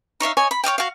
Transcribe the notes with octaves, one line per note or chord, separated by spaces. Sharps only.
D#4 C#5 E5 F5
C#5 D#5 G#5
B5
C#5 D#5 F5 G5
F#4 F5